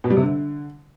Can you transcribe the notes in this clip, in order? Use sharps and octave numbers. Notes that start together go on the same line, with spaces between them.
B2
G3
C3
D3